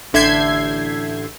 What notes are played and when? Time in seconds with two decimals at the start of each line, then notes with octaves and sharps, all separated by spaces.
0.13 A1 D3 E5 G6 G#6 C7